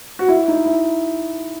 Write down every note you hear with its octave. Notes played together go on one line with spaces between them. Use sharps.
F#4
E4
D#4
E4